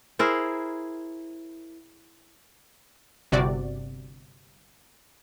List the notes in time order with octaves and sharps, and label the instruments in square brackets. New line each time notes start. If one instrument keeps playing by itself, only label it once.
[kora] E4 G#4 A#4 C5
[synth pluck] G1 C3 F#4 D5